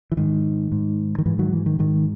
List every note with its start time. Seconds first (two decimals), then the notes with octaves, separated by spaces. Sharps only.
0.12 E3
0.17 G#2 D#3
0.72 G#2
1.18 D#3
1.26 G#2 E3
1.39 D#3 F#3
1.52 E3
1.66 D#3
1.79 G#2 D#3